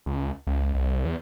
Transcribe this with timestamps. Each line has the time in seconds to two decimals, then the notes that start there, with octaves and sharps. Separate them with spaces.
0.06 C#2
0.47 C#2
0.74 C2
1.05 E2